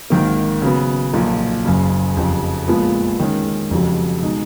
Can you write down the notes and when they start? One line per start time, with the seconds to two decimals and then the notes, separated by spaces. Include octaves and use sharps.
0.10 G#1 G#2 D#3 A#3
0.62 C#3 F#3 B3
1.14 B1 A#2 F3
1.65 F#1 F#2 C#3
2.16 F1 F2 C#3
2.68 A#1 A#2 F3 G#3 B3
3.20 D#3 G#3 C#4
3.70 F1 F2 C#3 F#3
4.22 B2 G#3 D#4